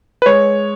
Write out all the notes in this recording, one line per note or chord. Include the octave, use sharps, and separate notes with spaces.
B4
G#3 C#5